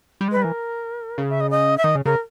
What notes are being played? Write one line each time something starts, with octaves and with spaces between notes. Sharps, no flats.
G3
G#3
G3 B4
E3 A#4
C#3
E5
D#5
D#5
E5
D#3 D#5
C#3
C#3 A#4